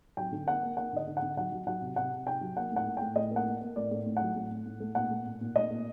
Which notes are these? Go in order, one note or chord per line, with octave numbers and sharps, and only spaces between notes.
F#3 G5
D3
A#3 F#5
A#3
A#3 F#5
D3 D#5
D3
F#5
D3
F#3 F#5
F#3
F#3 F#5
C3
C3 F#5
C3
C3 G5
F#3
A#3 F#5
A2 F#5
A2
A2 G5
A2 D#5
A#3
F#5
A#3
A#3
A2 D5
A2
A2
F#3 F#5
A2
A2
A2
A3
A#2 F#5
A3
A#2
A#2
A3 D#5
A#2